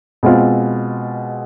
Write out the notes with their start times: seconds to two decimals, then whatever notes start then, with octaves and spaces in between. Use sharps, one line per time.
0.23 B2 G#3 C4 F4